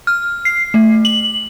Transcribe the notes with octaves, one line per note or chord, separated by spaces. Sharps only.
F6
C7
A3
F#7